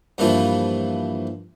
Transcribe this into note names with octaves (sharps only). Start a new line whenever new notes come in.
G2 A#2 E3 F3